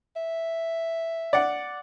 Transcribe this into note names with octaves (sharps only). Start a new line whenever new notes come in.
E5
D5 F#5